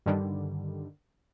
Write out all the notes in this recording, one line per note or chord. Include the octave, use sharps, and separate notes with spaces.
G2 D3 D#3 G3